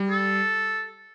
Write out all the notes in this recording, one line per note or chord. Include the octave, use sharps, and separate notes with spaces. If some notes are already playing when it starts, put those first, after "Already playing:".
Already playing: G3
A4